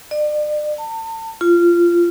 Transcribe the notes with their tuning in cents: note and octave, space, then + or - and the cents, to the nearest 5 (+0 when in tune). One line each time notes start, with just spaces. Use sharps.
D5 +40
A5 +35
F4 -15